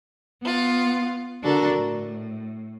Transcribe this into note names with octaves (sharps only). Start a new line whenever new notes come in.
B3 F4
D3 D4 F#4 A4 A#4
A2